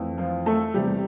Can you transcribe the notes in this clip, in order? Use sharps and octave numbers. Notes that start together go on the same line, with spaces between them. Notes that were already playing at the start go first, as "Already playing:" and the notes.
Already playing: F2 E3 A3
F3 F4
A3 A4
E2 C3 G3 G4